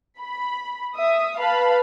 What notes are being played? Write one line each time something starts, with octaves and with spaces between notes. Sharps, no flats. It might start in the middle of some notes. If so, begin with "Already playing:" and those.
B5
E5 D#6
B4 F5 A5 B5